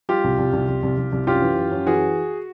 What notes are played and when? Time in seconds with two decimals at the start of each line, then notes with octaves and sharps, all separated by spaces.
0.09 G3 F4 G4
0.24 C2
0.39 C2
0.53 C2
0.69 C2
0.83 C2
0.98 C2
1.13 C2
1.27 F#2 F4 G4
1.42 E3
1.57 F#2
1.71 F#2
1.86 E3 F#4 G#4